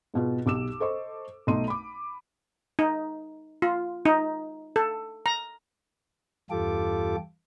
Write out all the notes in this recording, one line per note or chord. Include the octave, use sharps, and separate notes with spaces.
G#2 B2 F4
B1 G4 D6 E6 E7
A4 C5 D#5 C#6
B1 A3 D#4 C6 D#7
B5 D6
D#4
F4
D#4
A4
A#5
E2 G2 F4 G4 A4 D6